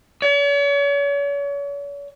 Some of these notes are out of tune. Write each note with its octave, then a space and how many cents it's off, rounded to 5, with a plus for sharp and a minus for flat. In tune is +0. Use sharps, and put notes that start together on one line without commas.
C#5 +40